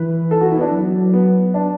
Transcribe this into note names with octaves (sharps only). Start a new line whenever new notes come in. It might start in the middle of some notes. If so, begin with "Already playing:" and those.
Already playing: E3 B4
A4
F#4
E4
B3
D4
F#3
B3
D4